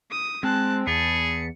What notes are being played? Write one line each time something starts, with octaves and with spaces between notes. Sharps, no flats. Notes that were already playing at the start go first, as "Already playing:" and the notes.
D#6
G#3 C4 A5 F#6
E2 G#4 B4 A5 C#7